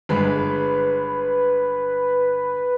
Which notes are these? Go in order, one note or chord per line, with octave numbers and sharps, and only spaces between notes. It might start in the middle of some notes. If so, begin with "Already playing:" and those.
G1 G#3 B4 B5